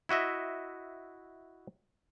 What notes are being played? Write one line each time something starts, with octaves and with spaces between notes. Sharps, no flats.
E4 F#4 D#5 E5